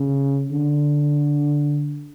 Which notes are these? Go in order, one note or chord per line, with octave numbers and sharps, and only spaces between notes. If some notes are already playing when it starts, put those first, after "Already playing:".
Already playing: C#3
D3